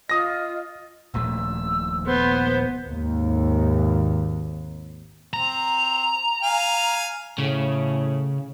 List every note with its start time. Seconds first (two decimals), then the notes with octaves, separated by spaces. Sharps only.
0.10 F4 D#5 D#6 A#6
1.14 D#1 A#1 A3 E6
2.06 B3 C5 C6
2.85 G#1 D#2
5.33 C4 A#5
6.43 F5 G#5
7.38 A2 C#3